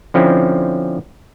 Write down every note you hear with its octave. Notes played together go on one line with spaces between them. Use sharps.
D3 F3 C4 C#4 E4